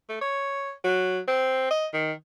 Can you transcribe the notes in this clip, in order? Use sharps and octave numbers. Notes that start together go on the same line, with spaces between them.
A3
C#5
F#3
C4
D#5
D#3